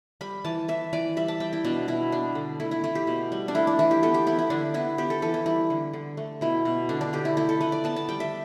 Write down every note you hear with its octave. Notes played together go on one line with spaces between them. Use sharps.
G3 B5
E3 A5
E3 E5
E3 D5
G3 E5
A5
G3 G5
E4
B2 D4
B2 E4
B3 D4
D3
A3 E4
E4
A3 E4
G4
B2
G3
D4
A3 E4
D4
E3 E4
G4
B3 A4
G4
B3 E4
E4
D3 D4
B3 E4
B3 G4
A4
E3 A4
E4
G3 E4
D3
D3
A3
B2 E4
B2
D3 D4
D4
D3 G4
E4
A3 E4
A4
A3 B4
D5
B3 A5
A5
G3 G5
E5